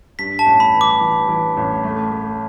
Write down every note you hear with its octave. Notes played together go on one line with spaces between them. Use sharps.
G2 B6
A5
A1
B5
E3
D6
E3
E3
A1
A3
A3